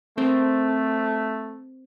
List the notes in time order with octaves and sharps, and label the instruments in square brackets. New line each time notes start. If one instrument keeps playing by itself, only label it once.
[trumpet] A3 [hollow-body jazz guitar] C4 A#4 C5